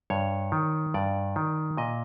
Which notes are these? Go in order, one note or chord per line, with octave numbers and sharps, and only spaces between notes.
G2 C#5
D#3
G2 D5
D#3
A#2 D#5